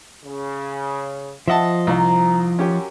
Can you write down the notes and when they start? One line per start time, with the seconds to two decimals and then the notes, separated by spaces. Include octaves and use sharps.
0.25 C#3
1.48 F3 D#5 E5 F#5 A5
1.87 C2 A#5
2.59 F#2 C#4 G4